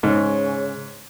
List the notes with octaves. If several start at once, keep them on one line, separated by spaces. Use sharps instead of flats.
G#2 C#3